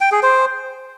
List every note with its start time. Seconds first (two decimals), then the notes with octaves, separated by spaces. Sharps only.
0.01 G5
0.12 G#4
0.23 C5